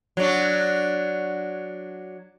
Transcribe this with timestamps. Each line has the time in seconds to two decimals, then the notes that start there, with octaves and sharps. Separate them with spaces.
0.17 F#3 D4